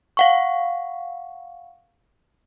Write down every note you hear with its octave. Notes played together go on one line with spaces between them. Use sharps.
F5 F#5 C#6